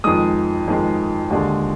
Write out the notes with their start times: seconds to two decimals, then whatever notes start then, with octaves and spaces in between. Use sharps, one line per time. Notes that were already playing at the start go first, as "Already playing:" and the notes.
0.04 F2 D#3 G#3 D#6
0.67 F2 D#3 G#3
1.30 D#2 D3 G#3